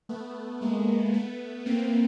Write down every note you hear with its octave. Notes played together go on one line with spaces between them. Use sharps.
A3 B3
G#3 A#3
A3 B3
A#3 C4